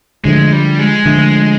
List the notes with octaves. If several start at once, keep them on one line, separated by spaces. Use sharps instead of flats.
D3 F3 G#3 A3
G3
G#3
D3 F3 A3